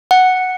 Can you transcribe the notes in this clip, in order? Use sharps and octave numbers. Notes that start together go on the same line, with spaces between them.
F#5